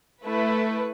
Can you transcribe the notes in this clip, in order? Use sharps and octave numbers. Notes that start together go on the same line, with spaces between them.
A3 E4 B4